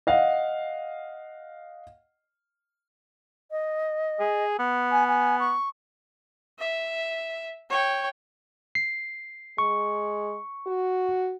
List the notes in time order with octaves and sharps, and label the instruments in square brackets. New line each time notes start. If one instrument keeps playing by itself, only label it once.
[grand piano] D#5 F5 F#5
[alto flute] D#5
[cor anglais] G#4
B3
[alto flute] G#5
G#5
C#6
[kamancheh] E5
C#5 G5
[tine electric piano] C7
[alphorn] G#3 [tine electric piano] C#6
[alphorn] F#4